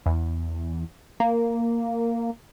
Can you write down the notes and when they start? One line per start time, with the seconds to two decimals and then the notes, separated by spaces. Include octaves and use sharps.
0.06 E2
1.20 A#3